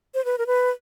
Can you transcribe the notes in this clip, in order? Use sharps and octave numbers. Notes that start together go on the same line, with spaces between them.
C5
B4
A#4
B4